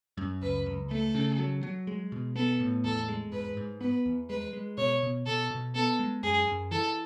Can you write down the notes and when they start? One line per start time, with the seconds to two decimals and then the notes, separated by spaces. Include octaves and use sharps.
0.17 F#2
0.42 C#2 B4
0.66 C#2
0.91 A3 A4
1.15 C#3
1.38 F#3
1.63 F#3
1.87 G#3
2.12 B2
2.36 B3 A4
2.60 A2
2.84 E2 A4
3.08 G#3
3.32 G#2 B4
3.57 G#2
3.81 B3 B4
4.05 E2
4.30 G#3 B4
4.53 G#3
4.78 B2 C#5
5.03 B2
5.26 B2 A4
5.50 B2
5.75 B3 A4
5.99 G#3
6.23 F#2 G#4
6.47 F#2
6.71 E3 A4